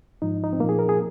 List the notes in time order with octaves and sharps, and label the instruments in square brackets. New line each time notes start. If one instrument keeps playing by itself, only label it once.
[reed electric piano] G#2 F3 D#4
D#4
C4
A#2 F3 A#3
G#4
A#4
G#4